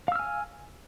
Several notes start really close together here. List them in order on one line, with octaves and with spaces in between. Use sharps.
F5 E6 F6 G#5